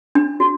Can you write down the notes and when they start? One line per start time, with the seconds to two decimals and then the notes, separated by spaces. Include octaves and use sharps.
0.15 D4
0.40 F#4